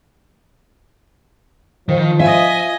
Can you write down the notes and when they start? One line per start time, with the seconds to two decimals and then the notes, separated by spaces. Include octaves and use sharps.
1.89 D#3 F3
2.20 F4 D#5 E5 G#5